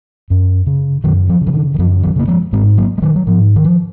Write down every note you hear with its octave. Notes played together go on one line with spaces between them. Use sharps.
F#2
C#3
F#2 D#3 F#3
F3
C#3
F3
D#3
D#3
F#2 F3
D#3 F#3
C#3 A#3
F3 G#3
G#2 G#3 C4
F#3 A#3
G#3
D#3 F#3
F#3
G#2 F3
D#3
F3